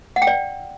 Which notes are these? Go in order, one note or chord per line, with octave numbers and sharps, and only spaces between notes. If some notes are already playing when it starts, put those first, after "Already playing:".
F#5
G5
D5